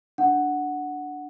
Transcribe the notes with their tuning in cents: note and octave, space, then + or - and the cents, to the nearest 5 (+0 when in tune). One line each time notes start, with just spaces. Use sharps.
D4 +0 F#5 +0